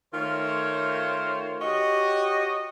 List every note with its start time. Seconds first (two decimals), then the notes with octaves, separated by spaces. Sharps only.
0.14 D#3 A3 F4 A#4 C5 C#5
1.61 F#4 G4 C#5 D#5